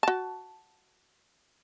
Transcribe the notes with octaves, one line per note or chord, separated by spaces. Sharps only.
F#4 A5